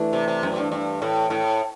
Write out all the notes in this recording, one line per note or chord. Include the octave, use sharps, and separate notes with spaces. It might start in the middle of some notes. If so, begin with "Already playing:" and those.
Already playing: E3 A3 D4
C3
C3
F#2
G2
G2
A2
A2